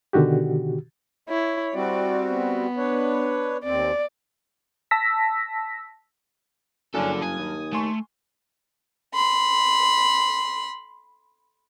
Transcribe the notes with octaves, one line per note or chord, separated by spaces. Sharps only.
B2 D3 D#3 F#4 G4
E4 C#5
G3 C4 F#4 D5
B3
D4 B4 C#5
D#2 C4 D5
A5 E6 A#6 B6
F#1 G2 F#3 C#4 D4 A4 D5
G#5 D#6
D#2
A3 G#5 C6 C#6
B5 C6